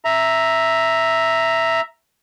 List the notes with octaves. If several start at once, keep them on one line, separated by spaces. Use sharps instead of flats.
E5 A#5